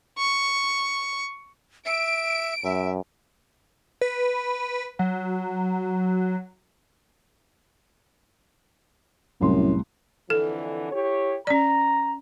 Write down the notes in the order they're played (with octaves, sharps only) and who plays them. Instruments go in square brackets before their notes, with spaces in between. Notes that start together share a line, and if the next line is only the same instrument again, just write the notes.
[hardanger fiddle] C#6
[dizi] E5 [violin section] D7
[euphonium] F#2 [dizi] E5
[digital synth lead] B4
F#3
[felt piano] C2 A2 C6 [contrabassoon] F#2
[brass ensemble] F2 D3 E3 [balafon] A4
[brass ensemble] E4 G4 C#5
[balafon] C#4 D5 [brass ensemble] A#5